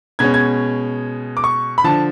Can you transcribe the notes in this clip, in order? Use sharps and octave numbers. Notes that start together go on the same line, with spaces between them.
B2 G#3 C#4 G#6
G#6
D6
C#6
B5
D3 F3 A5